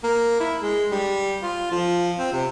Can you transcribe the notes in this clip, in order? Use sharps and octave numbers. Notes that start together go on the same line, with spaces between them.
A#3
E4
G#3
G3
F4
F3
C4
C3